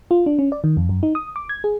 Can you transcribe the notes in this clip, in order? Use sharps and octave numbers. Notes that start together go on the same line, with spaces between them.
F4
D4
C#4
D5
D#3
F2
F#2
D#4
D#6
D6
G#6
G#4